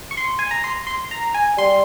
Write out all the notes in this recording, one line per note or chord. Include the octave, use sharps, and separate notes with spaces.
C#6
C6
G#5
A#5
C6
C6
A#5
G#5
G3 C6